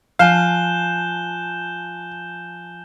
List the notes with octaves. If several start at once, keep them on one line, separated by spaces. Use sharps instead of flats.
F3 F5 G#5 A5 F#6 G6 E7 G7